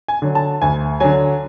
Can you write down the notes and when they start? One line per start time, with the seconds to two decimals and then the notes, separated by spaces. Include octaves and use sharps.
0.08 G#5
0.22 D3 F#3
0.35 A5
0.62 D2 G#5
1.00 D3 F#3 G#5